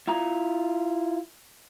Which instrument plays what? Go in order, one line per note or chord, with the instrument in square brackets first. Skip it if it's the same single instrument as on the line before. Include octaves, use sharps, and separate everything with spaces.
[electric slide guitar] E4 F4 A#5